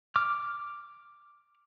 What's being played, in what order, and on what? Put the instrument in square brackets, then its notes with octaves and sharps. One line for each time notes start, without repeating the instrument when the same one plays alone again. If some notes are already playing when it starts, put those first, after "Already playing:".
[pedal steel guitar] D6 F6